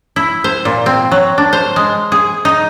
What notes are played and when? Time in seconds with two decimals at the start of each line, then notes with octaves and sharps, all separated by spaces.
0.16 E4
0.44 C5
0.65 A#2
0.86 C4
1.12 F#3
1.38 D4
1.53 C5
1.76 G#3
2.12 G#4
2.45 D#4